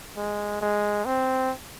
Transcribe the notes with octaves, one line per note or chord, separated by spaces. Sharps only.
G#3
G#3
C4